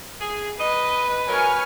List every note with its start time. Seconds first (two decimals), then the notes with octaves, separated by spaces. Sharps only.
0.20 G#4
0.60 B4 D#5
1.29 F#3 A#4 G#5 C#6 F6